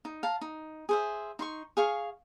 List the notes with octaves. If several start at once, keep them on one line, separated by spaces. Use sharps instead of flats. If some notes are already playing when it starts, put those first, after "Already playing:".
D#4
F5 A5 A#5
D#4
G#4 C5 E5
D#4 C6 C#6
G#4 F5 C#6